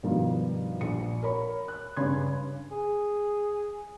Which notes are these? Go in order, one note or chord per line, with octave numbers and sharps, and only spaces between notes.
G2 B2 D#3 F3 G3
A#1 C#7
A#4 C#5 B5
F#6
G2 C#3 C#4 B5 C6 G#6
G#4